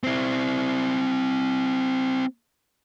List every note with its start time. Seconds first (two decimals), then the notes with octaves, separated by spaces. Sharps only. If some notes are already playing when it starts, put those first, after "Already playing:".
0.04 C4 E4